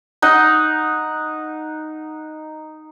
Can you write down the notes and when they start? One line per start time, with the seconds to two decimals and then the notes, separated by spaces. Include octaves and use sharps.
0.22 D#4 F#5